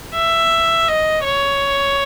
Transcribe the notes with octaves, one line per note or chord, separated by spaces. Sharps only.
E5
D#5
C#5